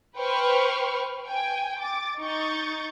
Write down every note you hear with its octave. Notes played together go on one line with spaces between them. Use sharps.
B4 C5 G5 B5 C#6 F6
G5 G#5
D6 A6
D#4 C#6 G6 A6